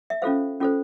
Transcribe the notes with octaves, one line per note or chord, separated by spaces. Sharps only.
E5
C#4 F4 A4 C5 F5
C#4 F4 A4 C5